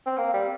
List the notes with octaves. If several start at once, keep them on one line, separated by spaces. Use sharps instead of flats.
C4
A#3
G3